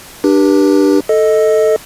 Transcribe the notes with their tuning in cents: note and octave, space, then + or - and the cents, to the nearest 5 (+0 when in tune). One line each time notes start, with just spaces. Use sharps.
D4 +20 G4 +0 B4 -40
A4 +0 D#5 +5